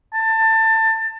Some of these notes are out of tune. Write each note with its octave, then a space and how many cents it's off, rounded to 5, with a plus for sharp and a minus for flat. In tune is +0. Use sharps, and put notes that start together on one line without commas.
A5 +20